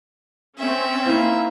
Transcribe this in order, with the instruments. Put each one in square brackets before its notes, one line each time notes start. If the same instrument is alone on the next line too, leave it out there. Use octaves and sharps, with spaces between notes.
[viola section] C4 C#4 [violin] E5
[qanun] A#3 D#4 F5 [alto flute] E4